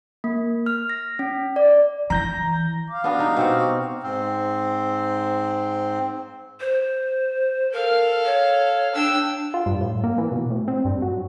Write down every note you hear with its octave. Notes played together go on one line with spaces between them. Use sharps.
A#3
F6
A#6
C#4
D5
E3 A#5 G6 A#6
F5 D6
B3 D4 F#4
D#4 G4
B2 C4 F#4
G#2 C4
C5
A4 A#4 F5
C#5
D4 G5 E6
F4
G2
A2
A#3
E3
B2
A2
C4
G2
F#3